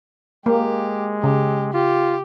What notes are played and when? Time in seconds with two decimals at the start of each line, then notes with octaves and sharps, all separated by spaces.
0.46 G#3 A#3 G4
1.24 C#3 G4
1.74 F4 G4